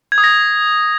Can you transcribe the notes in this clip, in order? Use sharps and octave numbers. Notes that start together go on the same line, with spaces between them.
G#6
D#6
A#6